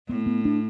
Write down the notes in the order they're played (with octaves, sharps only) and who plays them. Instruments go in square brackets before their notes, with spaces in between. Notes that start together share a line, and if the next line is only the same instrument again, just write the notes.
[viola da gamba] A2 [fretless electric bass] B3
[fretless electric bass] B3
D4